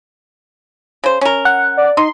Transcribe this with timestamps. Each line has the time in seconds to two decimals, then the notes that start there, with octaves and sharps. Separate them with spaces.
1.04 C#3 C5
1.21 C#4 A#4
1.45 F#5
1.77 D5
1.97 D#4 C6